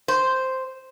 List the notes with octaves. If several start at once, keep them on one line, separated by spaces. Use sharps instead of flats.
C5